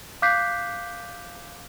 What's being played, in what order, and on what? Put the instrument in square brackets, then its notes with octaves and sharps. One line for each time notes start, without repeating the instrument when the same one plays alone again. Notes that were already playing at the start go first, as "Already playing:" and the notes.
[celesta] F5 D6 F#6 G6 B6 C7